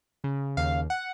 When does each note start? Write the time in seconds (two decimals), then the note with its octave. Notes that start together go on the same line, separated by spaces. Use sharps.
0.24 C#3
0.57 D#2 F5
0.90 F#5